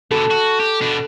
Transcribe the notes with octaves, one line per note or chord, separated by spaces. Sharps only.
B2 D3 A4
F#4
G4
B2 D4